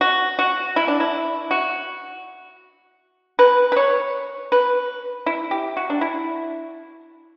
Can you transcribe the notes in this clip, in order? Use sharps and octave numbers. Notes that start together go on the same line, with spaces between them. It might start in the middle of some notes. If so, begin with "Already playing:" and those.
F#4
F#4
E4
D4
E4
F#4
B4
B4
C#5
B4
E4
G4
F#4
D4
E4